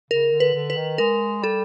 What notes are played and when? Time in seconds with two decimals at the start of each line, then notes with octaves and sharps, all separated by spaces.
0.10 C#3 A#4
0.32 D3
0.40 B4
0.54 D3
0.70 B4
0.76 D#3
0.98 G#3 A#4
1.42 G3 A4